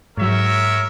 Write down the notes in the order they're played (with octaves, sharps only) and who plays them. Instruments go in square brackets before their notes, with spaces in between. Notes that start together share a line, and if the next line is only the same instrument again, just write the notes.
[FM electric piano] G#2 F#3 [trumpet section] A#4 C#5 E5